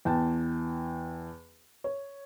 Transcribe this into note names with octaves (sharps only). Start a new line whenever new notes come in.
E2 G5 A5
C#5